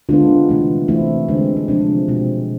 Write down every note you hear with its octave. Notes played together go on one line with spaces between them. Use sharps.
D3 G#3 B3 D4 F4
C3 E3 A3
C3 E3 A3 C4 E4
D3 G#3 C4
C4
C3 F3 G#3 D4
B2 G#3 C4